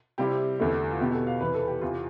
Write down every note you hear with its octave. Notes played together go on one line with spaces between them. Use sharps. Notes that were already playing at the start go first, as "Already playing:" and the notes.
C3 G3 C4 E4 G4
E2 D3 A3 E4
F4
B2 B3 E4 G4
A4
F5
E2 C3 E3 B4
A4
G4
E2 C3 E3 F4